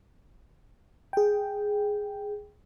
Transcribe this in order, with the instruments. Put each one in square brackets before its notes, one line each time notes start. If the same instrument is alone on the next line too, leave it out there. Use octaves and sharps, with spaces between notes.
[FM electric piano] G#4 G5